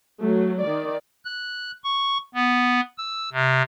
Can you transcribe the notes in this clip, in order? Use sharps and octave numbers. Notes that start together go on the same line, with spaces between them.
F#3 A3
D#3 D5
F#6
C#6
B3
E6
C3